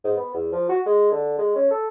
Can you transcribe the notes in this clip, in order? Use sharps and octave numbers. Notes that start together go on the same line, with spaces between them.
G#2
B3
E2
F3
F#4
G#3
D3
G#3
C#4
A4